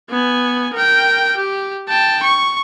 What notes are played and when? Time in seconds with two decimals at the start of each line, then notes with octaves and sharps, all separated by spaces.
0.10 B3 G#5
0.74 A#4 G5
1.37 G4
1.89 G5 A5
2.23 C#6